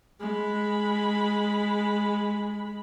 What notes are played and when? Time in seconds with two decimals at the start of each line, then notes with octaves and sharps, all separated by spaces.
0.21 G#3 B5